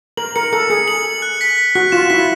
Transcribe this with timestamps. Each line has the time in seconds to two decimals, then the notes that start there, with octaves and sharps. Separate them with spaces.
0.17 A#4 F#7
0.36 A#4 C#7
0.53 A4 C#7
0.70 G#4 C#7
0.88 F#7
1.06 F#7
1.22 F#6
1.41 B6
1.58 B6
1.75 F#4 F#6
1.92 F4 E7
2.10 E4 B6